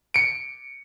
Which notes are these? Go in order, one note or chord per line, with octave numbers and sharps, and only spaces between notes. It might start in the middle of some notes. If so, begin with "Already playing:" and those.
C#7 D7